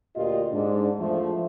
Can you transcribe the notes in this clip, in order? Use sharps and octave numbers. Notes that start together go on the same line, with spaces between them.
D2 A#2 F4 G4 D#5
G#2 D4
E2 F3 A3